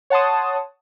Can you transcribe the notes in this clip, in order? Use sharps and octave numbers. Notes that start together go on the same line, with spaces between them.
C#5 F#5 A5 C6 D#6